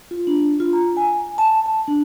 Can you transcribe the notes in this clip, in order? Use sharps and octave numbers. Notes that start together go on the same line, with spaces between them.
F4
D4
F4
A#5
G#5
A5
A5
D4